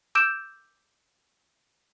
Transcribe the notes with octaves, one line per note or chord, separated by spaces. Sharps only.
D6 E6 G6 D7 E7